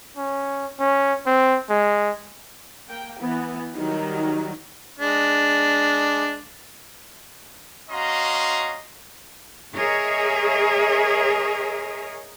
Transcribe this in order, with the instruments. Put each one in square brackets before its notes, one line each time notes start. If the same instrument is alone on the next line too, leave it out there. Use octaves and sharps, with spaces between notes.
[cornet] C#4
C#4
C4
G#3
[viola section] A#3 G5
E3 B3
[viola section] D#3 F#3 G3 [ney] D#4
[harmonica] G#3 D4
[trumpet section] C#4 F#4 D#5 F5 A#5 C6
[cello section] G#4 A#4 C#5 D#5 E5